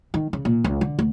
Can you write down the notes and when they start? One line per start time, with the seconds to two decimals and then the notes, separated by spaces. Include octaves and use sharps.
0.14 D#3
0.33 C#3
0.45 A#2
0.64 C#2
0.81 D3
0.99 D2